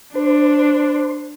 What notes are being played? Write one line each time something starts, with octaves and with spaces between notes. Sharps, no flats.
D4 C5